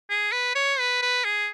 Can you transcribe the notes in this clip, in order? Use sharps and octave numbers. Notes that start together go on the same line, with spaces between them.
G#4
B4
C#5
B4
B4
G#4